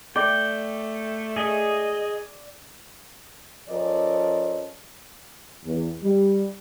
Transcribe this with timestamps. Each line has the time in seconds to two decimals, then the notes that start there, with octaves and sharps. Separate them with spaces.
0.16 A3 D5 G5
1.36 G#4 D#5
3.70 F3 C#4 A4 A#4 D5 D#5
5.64 E2
6.02 G3